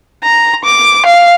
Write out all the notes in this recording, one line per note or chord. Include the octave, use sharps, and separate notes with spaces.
A#5
D6
F5